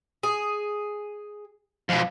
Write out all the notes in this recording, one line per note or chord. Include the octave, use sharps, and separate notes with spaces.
G#4
F2 B2